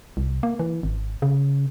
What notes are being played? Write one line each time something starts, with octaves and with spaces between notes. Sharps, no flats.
C2
A#3
E3
G#1
C#3